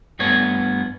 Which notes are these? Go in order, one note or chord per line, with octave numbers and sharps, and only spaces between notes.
G2 A3 B3 C#5